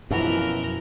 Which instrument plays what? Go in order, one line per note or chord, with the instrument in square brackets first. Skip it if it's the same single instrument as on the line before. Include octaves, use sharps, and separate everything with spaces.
[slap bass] F#2 B2 [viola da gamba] E3 A#4 [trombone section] F3